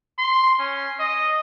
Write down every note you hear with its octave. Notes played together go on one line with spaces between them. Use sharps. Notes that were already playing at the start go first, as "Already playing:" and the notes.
C6
C#4
D#5